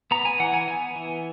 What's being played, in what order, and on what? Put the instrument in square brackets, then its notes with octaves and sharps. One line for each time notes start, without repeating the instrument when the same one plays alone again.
[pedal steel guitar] B3 A#5
G#5
E3 F#5
G#5
B3 G#5
E3